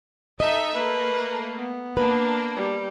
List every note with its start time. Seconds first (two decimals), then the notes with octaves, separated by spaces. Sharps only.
0.40 D#4 A4 D#5 E5
0.74 A3 A#3 B4
1.56 B3
1.97 A#3 D4 B4
2.56 G3